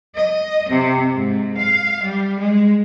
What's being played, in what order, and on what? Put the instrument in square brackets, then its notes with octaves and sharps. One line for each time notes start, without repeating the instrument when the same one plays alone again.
[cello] D#5
C3
G#2
F5
G3
G#3